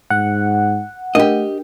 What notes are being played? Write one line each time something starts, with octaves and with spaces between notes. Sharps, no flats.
G#2 F#5
A3 D4 G4 A#4 D#5